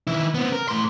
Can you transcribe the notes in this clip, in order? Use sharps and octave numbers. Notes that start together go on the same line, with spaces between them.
D#3 E4
B3 C4
A#4
A2 C6